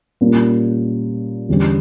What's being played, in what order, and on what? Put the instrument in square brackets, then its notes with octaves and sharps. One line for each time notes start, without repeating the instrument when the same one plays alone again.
[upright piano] A#2 G3 A#3 C#4
E2 D3 G3 C#4 G4